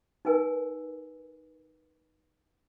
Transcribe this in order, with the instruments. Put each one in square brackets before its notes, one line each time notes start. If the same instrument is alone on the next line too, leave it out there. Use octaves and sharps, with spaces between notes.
[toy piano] D#4 A#4 B4 G#5 E6